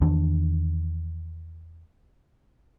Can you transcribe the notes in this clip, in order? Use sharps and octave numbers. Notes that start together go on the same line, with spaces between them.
E2 D#3 D4